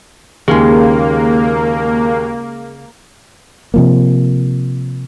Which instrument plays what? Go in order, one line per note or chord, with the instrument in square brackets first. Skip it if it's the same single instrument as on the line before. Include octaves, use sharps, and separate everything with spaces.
[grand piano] D#2 [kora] C#3 G#3 [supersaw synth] A#3 [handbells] G#4
[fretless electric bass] C3 F3 A#3